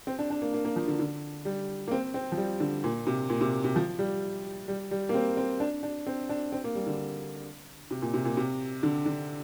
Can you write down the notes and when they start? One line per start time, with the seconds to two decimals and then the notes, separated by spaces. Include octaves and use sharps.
0.07 C4
0.19 D4
0.30 D4
0.42 A#3
0.54 A#3
0.65 A#3
0.76 F3
0.88 D3
0.99 D3
1.45 G3
1.88 A#3
1.91 C4
2.14 C4
2.32 F3
2.37 G3
2.60 D3
2.84 A#2
3.07 C3
3.30 A#2
3.41 C3
3.64 C3
3.76 F3
3.99 G3
4.68 G3
4.91 G3
5.09 A#3
5.14 C4
5.37 C4
5.60 D4
5.83 D4
6.07 C4
6.29 D4
6.52 C4
6.64 A#3
6.75 G3
6.87 D3
7.91 C3
8.02 A#2
8.14 C3
8.25 A#2
8.37 C3
8.83 D3
9.06 D3